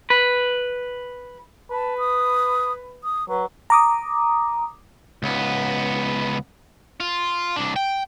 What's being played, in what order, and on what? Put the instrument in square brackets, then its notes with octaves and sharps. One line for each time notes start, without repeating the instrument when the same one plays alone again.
[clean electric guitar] B4
[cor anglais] B4 [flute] A5
[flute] D#6
D#6
[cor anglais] F#3 [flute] B4
[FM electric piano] A#5 D6 D#6
[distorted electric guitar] C#2 B3
F4
C2 D4
G5